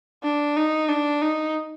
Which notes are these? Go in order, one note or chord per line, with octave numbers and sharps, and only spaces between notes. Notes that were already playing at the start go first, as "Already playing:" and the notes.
D4
D#4
D4
D#4